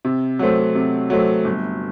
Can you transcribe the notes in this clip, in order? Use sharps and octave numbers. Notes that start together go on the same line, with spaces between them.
C3
F#3 A3 C4
C3
F#3 A3 C4
G1